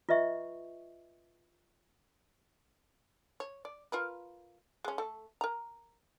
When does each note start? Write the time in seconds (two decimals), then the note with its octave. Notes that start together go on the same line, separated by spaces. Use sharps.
0.09 F4 B4 D#5 E5 C#6
3.40 C#5
3.65 D5
3.92 F4 A#4 B4
4.85 G#3 C#4
4.98 A3 A4
5.41 A#4 A#5